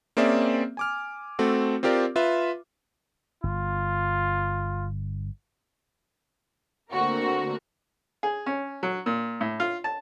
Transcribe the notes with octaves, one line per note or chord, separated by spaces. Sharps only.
A#3 C4 C#4 G#4 D5 E5
G#5 D6 F6
A3 C4 F#4 A4
C4 F4 G4 A#4 D5
F4 B4 E5
G1 F4
D3 A3 A#3 C4 F#4 A#4
G#4
C#4
F#3
A#2
A2
F4
A5